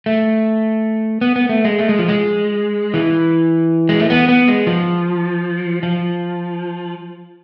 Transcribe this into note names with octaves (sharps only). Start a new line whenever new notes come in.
A3
B3
B3
A3
G#3
A3
G#3
F3
G#3
E3
G#3
A3
B3
B3
G#3
F3
F3